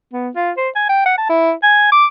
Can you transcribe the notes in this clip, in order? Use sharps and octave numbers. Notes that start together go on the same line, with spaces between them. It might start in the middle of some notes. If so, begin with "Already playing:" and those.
B3
F4
C5
G#5
G5
F#5
A5
E4
G#5
D6